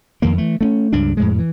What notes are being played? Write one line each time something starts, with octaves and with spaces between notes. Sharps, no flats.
F2 D#3 A#3
E3 A3
A3 C4 C#4
C#2 G2 D4
F2 A2 G#3
E3